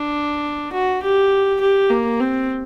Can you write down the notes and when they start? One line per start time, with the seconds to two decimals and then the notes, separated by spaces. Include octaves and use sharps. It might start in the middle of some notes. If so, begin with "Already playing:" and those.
Already playing: D4
0.73 F#4
1.03 G4
1.61 G4
1.90 A#3
2.20 C4